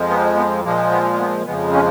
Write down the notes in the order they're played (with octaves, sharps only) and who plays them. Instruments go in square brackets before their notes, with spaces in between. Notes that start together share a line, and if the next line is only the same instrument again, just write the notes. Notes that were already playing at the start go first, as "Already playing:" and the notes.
Already playing: [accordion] F2 F3 G#3
B3
B3
A#2 F3 G#3 A#3
B3
A#3
B3
F2 C#3 F3 G#3 B3
C#4